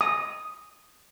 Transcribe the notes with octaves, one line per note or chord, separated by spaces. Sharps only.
D#6